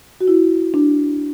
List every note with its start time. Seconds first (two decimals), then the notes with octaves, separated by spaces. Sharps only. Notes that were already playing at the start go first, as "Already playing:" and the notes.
0.20 F#4
0.28 E4
0.74 D4